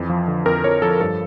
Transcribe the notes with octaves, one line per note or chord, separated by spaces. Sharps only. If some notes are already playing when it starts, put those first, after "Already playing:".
Already playing: F2 E3
F3
D3
F2 A#4
F2 C#5
F3 A4
G2 A4